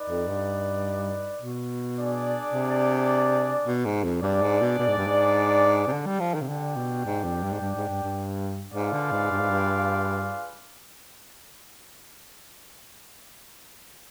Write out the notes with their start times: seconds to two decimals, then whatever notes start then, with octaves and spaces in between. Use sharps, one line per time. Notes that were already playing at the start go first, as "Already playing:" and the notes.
Already playing: D#4 B4 D5
0.09 F2
0.28 G2
1.41 B2
1.97 D4 G#4 D5
2.53 C3
3.66 B2
3.85 G#2
4.04 F2
4.22 G2 D4 G#4 D5
4.42 G#2
4.61 B2
4.79 B2
4.88 G#2
4.97 G2
5.07 G#2
5.87 C3
5.92 D3
6.06 G3
6.20 F3
6.34 D#3
6.42 C3
6.48 D3 D4 G4 D5 G5
6.76 B2
7.05 G#2
7.24 F2
7.43 G2
7.52 G#2
7.61 G2
7.75 G#2
7.89 G2
8.03 G2
8.73 G#2 F4 G#4 B4 D5 F5
8.93 D3
9.11 G#2
9.31 G2
9.40 G#2
9.49 G2